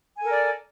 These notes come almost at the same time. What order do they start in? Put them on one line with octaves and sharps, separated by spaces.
G#5 A4 A#4 D5